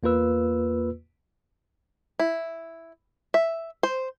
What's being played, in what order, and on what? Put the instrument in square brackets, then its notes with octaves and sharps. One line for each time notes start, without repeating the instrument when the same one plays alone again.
[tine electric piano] E2 A#3 F4 B4 E6
[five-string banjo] E4
E5
C5